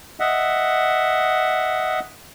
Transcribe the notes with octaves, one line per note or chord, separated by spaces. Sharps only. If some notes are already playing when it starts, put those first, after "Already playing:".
D#5 E5 F#5